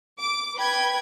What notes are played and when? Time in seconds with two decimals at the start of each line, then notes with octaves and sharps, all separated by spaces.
0.19 D6
0.57 B4 G5 B5 G#6